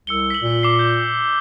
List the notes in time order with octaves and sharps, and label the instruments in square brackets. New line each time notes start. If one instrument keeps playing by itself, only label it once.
[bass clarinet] C2 [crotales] E6 C#7 G7
[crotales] B6 F#7
[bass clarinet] A#2
[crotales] D6 C7
G6